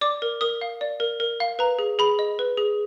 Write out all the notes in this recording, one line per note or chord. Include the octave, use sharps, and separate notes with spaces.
D5 D6
A#4
A#4 D#6
F5
D5
A#4
A#4
F5
B4 A#5
G#4
G#4 B5
D#5
B4
G#4